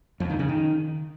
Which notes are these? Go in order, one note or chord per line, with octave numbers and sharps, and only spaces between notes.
F2
D#3
C#3
D#3